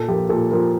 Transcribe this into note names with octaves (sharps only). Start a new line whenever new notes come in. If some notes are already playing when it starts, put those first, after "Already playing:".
Already playing: A#2 A4
F3 A#3 G4
A#2 A4
F3 A#3 A#4